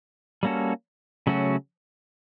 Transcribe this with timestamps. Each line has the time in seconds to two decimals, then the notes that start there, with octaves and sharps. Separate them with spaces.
0.43 G3 A#3 C#4 F#4 A4
1.27 C#3 F#3 A3 C#4 F#4